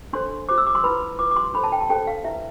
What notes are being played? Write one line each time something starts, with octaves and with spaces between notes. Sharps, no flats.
D4 A4 C5 C6
F4 C5 D6
E6
D6
C6
E4 B4 B5
F4 B4 D6
D6
C6
D4 A4 C5 B5
A5
G5
A5
D4 A4 C5 G5
F5
E4 B4 E5